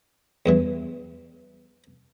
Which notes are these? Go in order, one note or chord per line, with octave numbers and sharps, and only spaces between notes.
E2 G2 E3